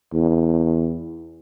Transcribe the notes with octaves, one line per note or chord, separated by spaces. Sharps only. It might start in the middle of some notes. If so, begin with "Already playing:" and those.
E2